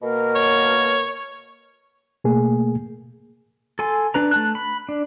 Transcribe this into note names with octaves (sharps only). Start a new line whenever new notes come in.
B2 A#3 A#4
C#5
B2 A3 A#3 G#4
A4 G#5 C6
D4 B4 A#5
A3 A5 F#6
B5
D4